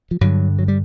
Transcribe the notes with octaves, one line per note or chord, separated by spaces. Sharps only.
F3
G2 D3 F#3
F#3
G3